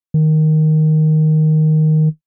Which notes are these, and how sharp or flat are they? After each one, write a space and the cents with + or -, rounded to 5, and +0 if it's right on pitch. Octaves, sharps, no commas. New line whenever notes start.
D#3 +0